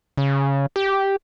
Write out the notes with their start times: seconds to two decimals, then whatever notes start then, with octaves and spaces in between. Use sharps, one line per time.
0.17 C#3
0.76 G4